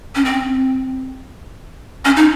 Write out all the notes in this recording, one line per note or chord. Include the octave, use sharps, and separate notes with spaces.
C#4
C4
C#4
D#4